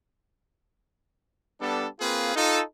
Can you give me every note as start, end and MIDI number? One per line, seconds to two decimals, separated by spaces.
1.61 1.87 55
1.61 1.87 59
1.61 1.87 62
1.61 1.87 69
2.00 2.35 58
2.00 2.35 60
2.00 2.35 65
2.00 2.35 68
2.00 2.35 71
2.36 2.61 63
2.36 2.61 65
2.36 2.61 69